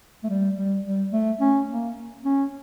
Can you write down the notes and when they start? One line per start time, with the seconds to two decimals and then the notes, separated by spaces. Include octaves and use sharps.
0.23 A3
0.29 G3
0.57 G3
0.84 G3
1.12 A3
1.40 C#4
1.69 A#3
2.25 C#4